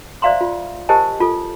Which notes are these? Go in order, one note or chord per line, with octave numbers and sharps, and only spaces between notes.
C5 D5 E5 F5 A#5 C6
F4
G4 A#4 C5 D#5 G#5 A5
F4 A4